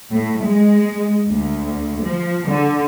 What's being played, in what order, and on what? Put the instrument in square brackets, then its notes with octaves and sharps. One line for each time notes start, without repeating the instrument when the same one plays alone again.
[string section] A2
G#3
D2
F3
D3